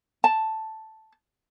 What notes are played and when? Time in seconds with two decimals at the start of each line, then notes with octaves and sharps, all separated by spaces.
0.24 A5